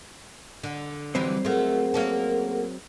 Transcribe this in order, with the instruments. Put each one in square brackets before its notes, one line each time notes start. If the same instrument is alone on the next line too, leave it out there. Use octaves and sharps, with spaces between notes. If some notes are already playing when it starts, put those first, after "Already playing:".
[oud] D3
[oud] D3 E3 G3 [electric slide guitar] F#3 C4 C5
[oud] A3 F4 [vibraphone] G#4 A#4 F#5
[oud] A#3 C#4 A4